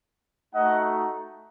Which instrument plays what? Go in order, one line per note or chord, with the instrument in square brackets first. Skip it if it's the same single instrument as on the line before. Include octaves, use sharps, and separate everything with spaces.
[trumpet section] A3 D#4 F#4 D#5 F#5